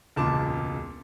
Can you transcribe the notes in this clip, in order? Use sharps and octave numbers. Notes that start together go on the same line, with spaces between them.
E1 C#2 A#2 A5 D6